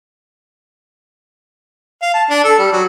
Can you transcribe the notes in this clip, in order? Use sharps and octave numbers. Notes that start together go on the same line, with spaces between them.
F5
A5
D4
A4
G3
F#3